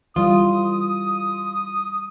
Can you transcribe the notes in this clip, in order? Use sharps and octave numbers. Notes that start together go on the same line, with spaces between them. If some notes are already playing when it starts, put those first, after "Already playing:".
E3 G3 F4 D#6